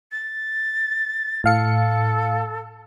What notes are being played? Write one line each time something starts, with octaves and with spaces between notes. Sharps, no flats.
A6
A2 A4 F5 C#7